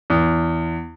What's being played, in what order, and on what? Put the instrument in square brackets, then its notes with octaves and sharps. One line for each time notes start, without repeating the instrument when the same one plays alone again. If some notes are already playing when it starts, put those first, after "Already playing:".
[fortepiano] E2